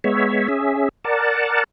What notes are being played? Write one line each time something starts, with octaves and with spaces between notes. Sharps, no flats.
G#3 B3 C#5 E5
C#4 G#4 E5
A#4 D5 F#5 A5